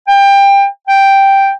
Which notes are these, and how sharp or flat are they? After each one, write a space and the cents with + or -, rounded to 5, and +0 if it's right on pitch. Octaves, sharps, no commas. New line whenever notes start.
G5 +20
G5 +0